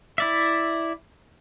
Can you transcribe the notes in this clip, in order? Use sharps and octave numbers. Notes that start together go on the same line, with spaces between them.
E4 D5 E5